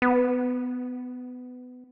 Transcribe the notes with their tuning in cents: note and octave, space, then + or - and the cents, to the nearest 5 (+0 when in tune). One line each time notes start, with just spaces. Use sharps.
B3 +20